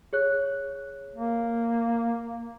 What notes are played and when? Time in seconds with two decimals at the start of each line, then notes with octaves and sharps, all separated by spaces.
0.13 G#4 C#5 F#6
1.15 A#3